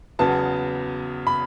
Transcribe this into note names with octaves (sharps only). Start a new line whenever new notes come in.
E2 C#3 F#3 B3 A5
B5